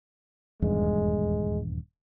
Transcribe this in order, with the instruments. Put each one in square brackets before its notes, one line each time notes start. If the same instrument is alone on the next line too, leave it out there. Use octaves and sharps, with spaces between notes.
[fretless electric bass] D#1 E2 G2 [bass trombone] G#3